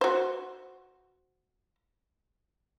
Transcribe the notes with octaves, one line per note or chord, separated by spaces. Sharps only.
F#4 C5